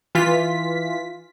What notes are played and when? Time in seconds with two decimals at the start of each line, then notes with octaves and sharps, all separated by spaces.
0.15 E3 F4 B6